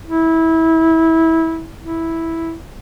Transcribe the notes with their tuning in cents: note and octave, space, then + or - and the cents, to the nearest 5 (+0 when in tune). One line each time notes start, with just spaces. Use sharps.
E4 -20
E4 -5